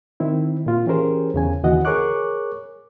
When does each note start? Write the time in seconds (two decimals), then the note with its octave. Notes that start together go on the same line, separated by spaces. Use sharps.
0.20 D#3 C4 E4
0.66 A#2 F4
0.87 E3 C#4 G4 G#4 A#4 C5
1.34 E2 C#3 G#5
1.63 D#2 C#3 E3 F#4 D#5 F#5
1.85 G#4 A#4 C#5 C#6 D6 F#6